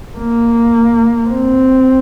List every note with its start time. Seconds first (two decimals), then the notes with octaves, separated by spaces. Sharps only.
0.18 A#3
1.29 C4